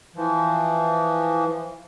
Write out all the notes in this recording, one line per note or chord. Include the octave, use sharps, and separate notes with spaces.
E3 F3